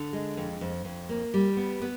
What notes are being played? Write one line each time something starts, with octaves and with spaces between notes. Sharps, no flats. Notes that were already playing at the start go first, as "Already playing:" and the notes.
Already playing: D3
G#3
F2
F2
F2
A#3
G3
B3
B3